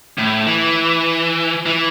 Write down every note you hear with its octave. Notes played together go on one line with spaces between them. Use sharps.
A2
E3
E3